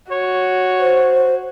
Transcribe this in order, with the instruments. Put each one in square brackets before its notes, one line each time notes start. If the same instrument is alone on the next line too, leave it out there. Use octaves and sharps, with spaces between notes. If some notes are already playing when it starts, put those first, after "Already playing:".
[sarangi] F#4 [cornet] C#5
[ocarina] C5